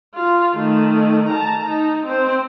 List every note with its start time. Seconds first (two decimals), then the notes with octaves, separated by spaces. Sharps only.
0.15 F4
0.55 D#3 A3
1.29 A5 A#5
1.69 D#4
2.06 C4 C5